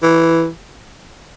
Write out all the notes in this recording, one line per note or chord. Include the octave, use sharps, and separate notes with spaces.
E3